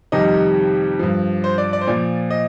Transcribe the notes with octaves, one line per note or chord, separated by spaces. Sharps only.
F2 C3 D#3 G3 D#5
G2 F3
C5
D5
D5
C5
A#2 F3 D5
D#5